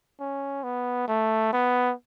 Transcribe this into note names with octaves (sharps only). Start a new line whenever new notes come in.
C#4
B3
A3
B3